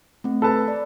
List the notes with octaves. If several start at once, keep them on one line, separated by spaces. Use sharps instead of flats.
A3 C4
A4 B4 A5
D5